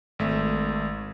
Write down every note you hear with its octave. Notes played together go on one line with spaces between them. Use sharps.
G#1 A3 E5